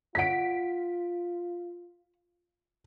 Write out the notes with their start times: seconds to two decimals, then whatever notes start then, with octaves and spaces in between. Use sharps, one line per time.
0.15 F4 C#5 F#5 B6 D7